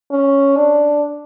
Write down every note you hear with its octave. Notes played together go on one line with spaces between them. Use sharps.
C#4
D4